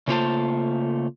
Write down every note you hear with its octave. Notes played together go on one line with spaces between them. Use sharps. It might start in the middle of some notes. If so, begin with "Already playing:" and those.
C#3 A3 A#3 F4 C5 A5